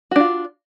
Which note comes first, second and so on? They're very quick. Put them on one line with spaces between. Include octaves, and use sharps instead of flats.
F#4 D4 F4